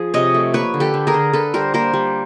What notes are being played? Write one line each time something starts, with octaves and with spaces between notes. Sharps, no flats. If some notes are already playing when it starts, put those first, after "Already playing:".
Already playing: F3 G#4
C3 C#5 D#5
A3
A#3 B4 C#5
D3
G4 A4
D3
G#4 A#4
D3
D3 A4 B4
G3 A#4 C5
A#3 A#4 C5
G3